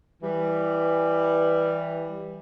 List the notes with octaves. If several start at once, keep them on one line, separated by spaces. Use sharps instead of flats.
E3 G3